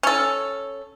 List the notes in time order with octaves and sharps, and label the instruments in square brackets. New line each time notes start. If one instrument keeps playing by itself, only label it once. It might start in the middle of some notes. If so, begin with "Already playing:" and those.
[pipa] C#4 A4